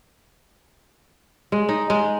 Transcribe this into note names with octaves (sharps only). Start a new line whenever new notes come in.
G#3
D#4
G#3